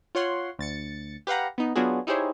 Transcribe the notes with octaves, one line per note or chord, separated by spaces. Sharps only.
F4 C#5 F#5 C6
D2 A6 C#7
G4 B4 F5 F#5 A#5
B3 D#4
F#3 B3 D4 F4 F#4 G#4
D#4 E4 G4 G#4 C5 C#5